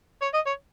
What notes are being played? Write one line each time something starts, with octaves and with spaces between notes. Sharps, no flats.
C#5
D#5
C#5